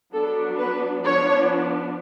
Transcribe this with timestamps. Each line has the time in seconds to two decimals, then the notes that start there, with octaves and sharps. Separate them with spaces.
0.14 F#3 B3 D4 A4
0.59 B4
1.04 F3 B3 D4 C#5